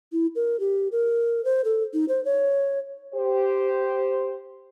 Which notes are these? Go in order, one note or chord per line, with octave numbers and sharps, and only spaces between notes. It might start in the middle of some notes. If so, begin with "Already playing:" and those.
E4
A#4
G4
A#4
C5
A4
D#4
C5
C#5
G4 C5